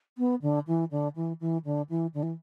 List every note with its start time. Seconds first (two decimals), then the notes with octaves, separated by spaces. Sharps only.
0.18 B3
0.42 D3
0.67 E3
0.91 D3
1.16 E3
1.40 E3
1.65 D3
1.89 E3
2.14 D3
2.23 E3